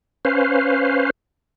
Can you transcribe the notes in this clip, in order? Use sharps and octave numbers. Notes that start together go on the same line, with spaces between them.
C#4 B4 C5 F5